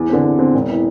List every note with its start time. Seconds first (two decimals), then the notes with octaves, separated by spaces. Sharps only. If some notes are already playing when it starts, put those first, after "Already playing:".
Already playing: E2
0.09 D3 C4
0.24 E2
0.39 D3 C4
0.54 E1
0.69 E3